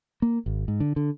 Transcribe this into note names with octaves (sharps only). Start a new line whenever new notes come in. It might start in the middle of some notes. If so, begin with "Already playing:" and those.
A#3
G#1
G#2
D3
D3